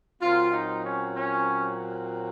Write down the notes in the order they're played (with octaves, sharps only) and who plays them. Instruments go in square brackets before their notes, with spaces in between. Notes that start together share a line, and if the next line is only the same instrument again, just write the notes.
[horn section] A#2 F#3 C4 F4
D#4
C#4
C#4